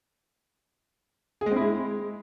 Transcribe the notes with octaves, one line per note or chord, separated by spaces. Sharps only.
G#4
G#3
C4
E4
G#3